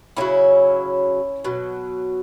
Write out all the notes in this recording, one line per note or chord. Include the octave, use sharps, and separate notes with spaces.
C#3 F#3 C#4 E4
B2 F#3